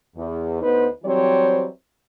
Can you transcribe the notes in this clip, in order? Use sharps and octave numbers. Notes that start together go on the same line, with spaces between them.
E2
D2 B3 D#4 B4 C5
E3 F#3 G3 C4 C5 C#5